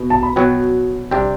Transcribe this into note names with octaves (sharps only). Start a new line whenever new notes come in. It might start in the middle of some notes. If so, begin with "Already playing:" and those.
Already playing: B2
A5
B5
B2 F#3 B3 G5
C3 G3 D4 G4 G5